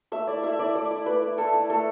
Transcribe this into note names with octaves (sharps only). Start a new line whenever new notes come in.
A3 E5
E4 D5
A3 E5
E4 D5
A3 D5
E4
A3 B4
E4
A3 A4
E4
A3 A4